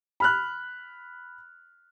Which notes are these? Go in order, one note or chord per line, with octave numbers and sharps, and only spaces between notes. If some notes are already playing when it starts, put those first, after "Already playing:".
B5 F6 F#6